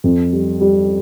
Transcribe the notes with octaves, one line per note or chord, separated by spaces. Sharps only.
F2
G3
G3